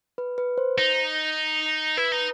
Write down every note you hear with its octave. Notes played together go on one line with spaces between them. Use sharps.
B4
B4
C5
D#4
E4 B4
D#4